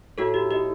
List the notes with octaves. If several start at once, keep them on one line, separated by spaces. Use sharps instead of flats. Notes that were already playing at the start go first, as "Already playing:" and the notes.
A2 F#4 A4
G4
D#4 G4